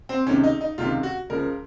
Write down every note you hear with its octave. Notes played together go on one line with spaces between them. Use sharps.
C4
C#2 C3 D#3 C#4
D#4
D#4
C#2 C3 D#3 F4
F#4
C#2 C#3 F3 A#4